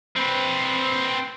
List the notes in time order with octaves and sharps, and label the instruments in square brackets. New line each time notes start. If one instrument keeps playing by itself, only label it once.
[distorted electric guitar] C4 B4